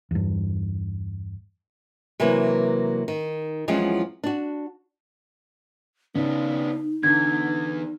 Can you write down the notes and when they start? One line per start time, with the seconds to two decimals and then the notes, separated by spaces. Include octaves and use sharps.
0.11 E2 G2
2.20 C3 E3 F#3 A#3 B4
3.08 D#3
3.68 E2 F3 F#3 G#3 C4 C#4
4.24 D4 F#4
6.15 C#3 B3 D4 D#4
7.03 E2 D3 G#6